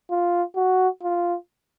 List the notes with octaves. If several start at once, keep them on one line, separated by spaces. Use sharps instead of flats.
F4
F#4
F4